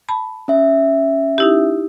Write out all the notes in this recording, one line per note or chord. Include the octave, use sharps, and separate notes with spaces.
A5 B5
C#4 E5
D#4 E4 G4